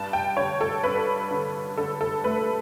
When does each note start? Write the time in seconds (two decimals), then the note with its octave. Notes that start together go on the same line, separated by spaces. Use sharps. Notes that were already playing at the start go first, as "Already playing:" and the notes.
Already playing: G2 A5
0.13 G5
0.37 D3 C#5
0.61 A4
0.84 G2 B4
1.31 D3
1.78 D3 A4
2.01 A4
2.24 A3 B4